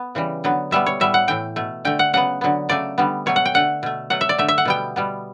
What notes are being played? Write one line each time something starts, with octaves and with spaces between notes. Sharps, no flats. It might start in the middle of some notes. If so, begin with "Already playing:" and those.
Already playing: B3
C#3 E3 G3
D3 F#3 B3
B2 G3 B3 E5
C#5
A2 G3 B3 E5
F#5
A2 E3 A3 G5
B2 A3
D3 A3 G5
F#5
C#3 F#3 B3 F#5
D3 F#3 B3
C#3 F#3 A3 D5
D3 G3 B3
B2 F#3 A3 C#5
F#5
G5
D3 A3 F#5
B2 A3
B2 F#3 A3 F#5
E5
D5
D3 A3 E5
E5
F#5
B2 G3 B3 G5
B2 G3 B3